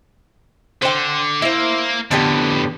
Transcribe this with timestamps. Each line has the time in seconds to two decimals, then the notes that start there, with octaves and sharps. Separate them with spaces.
0.82 D3 C5 G5
1.42 A#3 E4 C5
2.11 F2 A2 D3 B3 G4